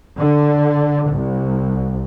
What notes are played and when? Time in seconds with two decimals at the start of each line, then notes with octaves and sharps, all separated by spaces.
0.17 D3
1.11 C2